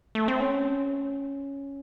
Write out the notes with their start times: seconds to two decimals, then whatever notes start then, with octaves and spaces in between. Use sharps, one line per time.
0.15 A3
0.28 C4
0.40 C#4